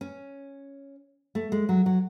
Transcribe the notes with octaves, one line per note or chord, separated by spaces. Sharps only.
C#4
A3
G#3
F#3
F#3